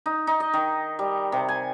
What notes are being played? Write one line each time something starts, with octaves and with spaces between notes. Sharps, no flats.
D#4
D#4
D#5
D#3
G3
C3
G#5